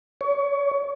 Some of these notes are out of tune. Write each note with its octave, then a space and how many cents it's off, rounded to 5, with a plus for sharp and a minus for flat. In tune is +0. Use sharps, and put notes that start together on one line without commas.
C#5 +30